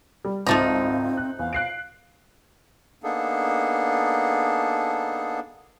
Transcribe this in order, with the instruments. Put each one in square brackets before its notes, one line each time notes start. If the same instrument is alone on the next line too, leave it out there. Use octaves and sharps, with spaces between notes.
[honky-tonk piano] G3
[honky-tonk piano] G#1 C#2 [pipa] F3 A3 D#4 [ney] C4
[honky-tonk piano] F#6
[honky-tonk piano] E2 [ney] F5
[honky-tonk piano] F#6 C7 D7
[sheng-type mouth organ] A#3 B3 D4 D#4 G#4 A4